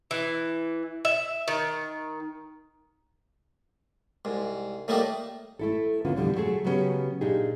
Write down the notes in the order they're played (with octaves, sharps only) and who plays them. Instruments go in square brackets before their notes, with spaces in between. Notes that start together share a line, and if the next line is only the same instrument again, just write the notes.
[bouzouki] E3
E5
D#3
[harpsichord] C2 G#2
A2 D#3 G3 A3 A#3 D#4
[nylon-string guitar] A3 E4 A4
D3 A#3 B3 C#4 F4
F2 B2 D3 E3 G3
F#3 A3 F#4 G#4
C#3 F#3 B3 C#4 G4
A#2 D4 D#4 G4 G#4